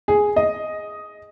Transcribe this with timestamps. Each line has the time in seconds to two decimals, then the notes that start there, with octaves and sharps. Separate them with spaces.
0.08 G#4
0.36 D#5